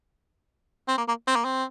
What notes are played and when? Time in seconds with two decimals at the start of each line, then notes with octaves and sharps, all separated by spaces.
0.88 C4
0.98 A#3
1.08 A#3
1.27 C4
1.36 A#3
1.45 C4